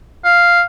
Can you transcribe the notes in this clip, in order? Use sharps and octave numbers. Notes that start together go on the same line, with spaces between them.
F5